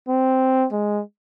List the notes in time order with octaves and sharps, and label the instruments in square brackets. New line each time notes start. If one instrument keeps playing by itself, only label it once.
[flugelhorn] C4
G#3